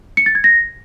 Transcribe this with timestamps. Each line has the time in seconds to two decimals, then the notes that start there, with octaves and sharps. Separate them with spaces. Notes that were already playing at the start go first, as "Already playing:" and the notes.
0.17 C#7
0.26 A6
0.35 G#6
0.44 A#6